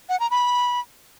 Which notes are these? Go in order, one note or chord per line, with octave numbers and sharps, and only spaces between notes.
F#5
A#5
B5